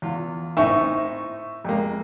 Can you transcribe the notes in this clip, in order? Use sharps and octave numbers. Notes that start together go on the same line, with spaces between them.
E2 F4
A2 C4 D#4 E5 C#6
F2 G#3 A#3